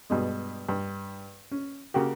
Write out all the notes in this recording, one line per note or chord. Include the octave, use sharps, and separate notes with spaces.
G2 B2 G#3
G2
C#4
C#3 A#3 F#4 G4